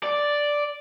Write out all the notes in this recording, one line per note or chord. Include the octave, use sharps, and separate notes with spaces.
D5